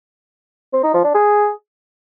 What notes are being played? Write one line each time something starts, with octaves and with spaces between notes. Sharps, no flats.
C4
D#4
F3
D4
G#4